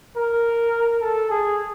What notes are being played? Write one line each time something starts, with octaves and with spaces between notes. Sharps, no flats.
A#4
A4
G#4